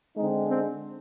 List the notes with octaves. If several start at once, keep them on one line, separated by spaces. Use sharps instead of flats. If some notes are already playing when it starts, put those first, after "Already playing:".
D3 G#3 C4 D#4
C4